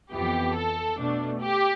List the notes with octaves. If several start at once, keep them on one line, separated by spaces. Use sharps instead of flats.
F2 E3 B3 G4
A4
B2 A3 D4
G4